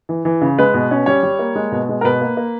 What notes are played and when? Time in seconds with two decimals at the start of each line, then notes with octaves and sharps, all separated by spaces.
0.09 E3
0.25 E3
0.41 C#3
0.58 G#3 B4
0.74 B2
0.91 C#4
1.06 G3 C#5
1.23 G3
1.39 A#3
1.55 G#3
1.72 B2
1.89 G#3
2.01 A#4
2.04 B2 B4
2.21 A#3
2.37 A#3